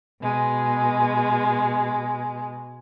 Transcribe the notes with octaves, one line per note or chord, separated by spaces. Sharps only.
B2 G#3